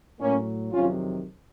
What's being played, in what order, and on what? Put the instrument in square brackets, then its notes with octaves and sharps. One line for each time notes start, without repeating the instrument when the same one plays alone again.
[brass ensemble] A2 F#3 A#3 C#4
F2 C3 D#3 F#3 C#4 F4